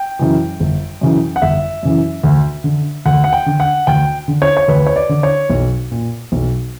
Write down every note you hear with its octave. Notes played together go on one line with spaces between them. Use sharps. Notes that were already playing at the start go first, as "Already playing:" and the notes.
Already playing: G5
F#2 C#3 E3
G1
F#2 C#3 E3
F#5
G1 E5
F#2 C#3 E3
D2
D3
D2 F#5
F#5
G5
D3
F#5
D2 G5
D3
C#5
C#5
D2 B4
C#5
D5
D3
C#5
B1
A#2
B1